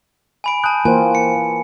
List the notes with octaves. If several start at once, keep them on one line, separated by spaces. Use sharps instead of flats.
G#5 B5 D7
G#5 A5 D#6 F#6 G6
E3 A#3 F4 A#4 C5 G5 G#5
C#7